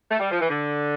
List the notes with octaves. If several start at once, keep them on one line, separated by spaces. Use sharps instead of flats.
A3
G3
F3
E3
D3